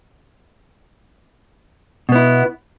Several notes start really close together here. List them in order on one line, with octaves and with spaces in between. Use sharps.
B2 B3 E4